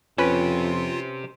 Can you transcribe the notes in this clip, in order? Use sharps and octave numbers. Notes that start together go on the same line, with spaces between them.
F2 C#4 F4 G4 B4 C5